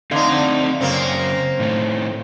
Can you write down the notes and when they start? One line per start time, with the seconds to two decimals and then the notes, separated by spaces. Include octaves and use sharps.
0.11 D3 A3 C4 D#4 F5
0.81 F#2 C#3 A#3 C4
1.60 A2 D#3 A3